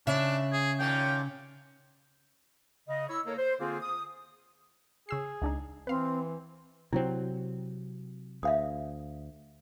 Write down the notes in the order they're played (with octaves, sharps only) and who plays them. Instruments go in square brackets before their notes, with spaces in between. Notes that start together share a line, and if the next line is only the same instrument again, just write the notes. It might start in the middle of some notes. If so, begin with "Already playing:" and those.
[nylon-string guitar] C#3 [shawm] D4 [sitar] E5
[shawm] G#4
[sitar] D#2 A#2 C#4 [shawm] G5
[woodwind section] C#3 D#5
E4 C#5 E6
A#3 A4 A#4 C#5
C5
D3 A#3 C4 F4 G#4
D#6
[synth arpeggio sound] C#3 E6 C7 [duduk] G#4
[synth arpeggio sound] C#2 D4 D#4
[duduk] E3 [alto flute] C4 [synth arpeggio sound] B4 F5
[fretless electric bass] C3 F#3 C4 [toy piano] E4
[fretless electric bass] D2 [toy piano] E5 F5 D#6